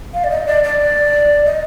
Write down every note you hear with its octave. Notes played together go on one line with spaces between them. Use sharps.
F5
D5
D#5
D5
D5
D#5